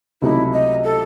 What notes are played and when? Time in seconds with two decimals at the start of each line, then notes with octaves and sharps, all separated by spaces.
0.22 C#2 C3 F#3 A3 D#4 E4
0.53 D#5
0.84 A4